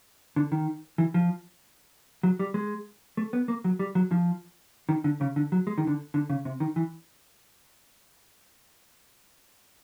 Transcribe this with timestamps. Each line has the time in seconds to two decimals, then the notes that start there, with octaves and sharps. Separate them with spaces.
0.36 D3
0.52 D#3
0.98 E3
1.14 F3
2.23 F#3
2.39 G3
2.54 G#3
3.17 A3
3.33 B3
3.48 A#3
3.64 F#3
3.79 G3
3.95 F#3
4.11 F3
4.89 D#3
5.04 D3
5.21 C#3
5.36 D3
5.52 F#3
5.67 G#3
5.78 D#3
5.87 D3
6.14 D3
6.30 C#3
6.45 C3
6.60 D#3
6.76 E3